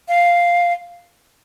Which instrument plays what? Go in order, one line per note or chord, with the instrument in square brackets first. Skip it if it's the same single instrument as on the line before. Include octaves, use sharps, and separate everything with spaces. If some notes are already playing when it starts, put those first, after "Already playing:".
[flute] F5